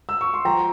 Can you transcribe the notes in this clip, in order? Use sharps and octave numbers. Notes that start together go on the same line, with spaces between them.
E6
C#6
C6
F3 G5 A#5